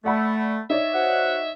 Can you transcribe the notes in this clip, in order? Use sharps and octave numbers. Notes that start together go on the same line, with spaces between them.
A3 D5 F#5 B5
D#4 C#5 D5 E5
F#4 C5 F#5